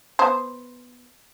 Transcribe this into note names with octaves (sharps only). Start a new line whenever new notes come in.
B3 C5